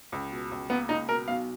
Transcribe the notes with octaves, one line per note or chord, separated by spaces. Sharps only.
C#2
B2
C#2
A#3 B3
C#2 D#4
B2 A#4
B1 F5